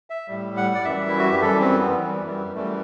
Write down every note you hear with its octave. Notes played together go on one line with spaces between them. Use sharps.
E5
A2 G3
F#5
D5
F#2 E3 G3 E5
E4
F#4
G4
F#2 E3 G3 A4
C4
B3
F#2 E3 G3
G3
F#2 E3 G3 A3